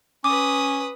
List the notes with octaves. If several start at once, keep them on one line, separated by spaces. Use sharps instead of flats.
C#4 B4 D6 D#6